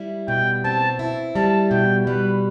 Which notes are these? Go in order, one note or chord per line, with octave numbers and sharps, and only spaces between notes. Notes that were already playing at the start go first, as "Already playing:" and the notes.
Already playing: G3 E4
B2 G5
C4 A5
E4
G3 A5
B2 G5
G3 B4